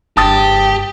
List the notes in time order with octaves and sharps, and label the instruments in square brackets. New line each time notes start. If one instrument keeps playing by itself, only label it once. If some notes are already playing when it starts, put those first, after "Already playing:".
[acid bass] F#1 [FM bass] G2 [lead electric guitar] G4 [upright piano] A5 D#6 A6